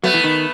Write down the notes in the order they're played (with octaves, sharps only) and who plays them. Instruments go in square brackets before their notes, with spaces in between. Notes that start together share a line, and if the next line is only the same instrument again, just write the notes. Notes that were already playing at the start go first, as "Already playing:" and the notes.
[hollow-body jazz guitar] F#3 [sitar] A3 B3
[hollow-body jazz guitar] E3
D#3